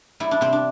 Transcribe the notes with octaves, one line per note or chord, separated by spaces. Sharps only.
G3 E4
D4
C3 C4
D4